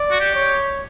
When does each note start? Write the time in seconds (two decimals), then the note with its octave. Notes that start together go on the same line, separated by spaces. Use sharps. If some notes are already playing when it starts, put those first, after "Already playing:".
Already playing: D5
0.11 F#4
0.20 G4
0.35 C#5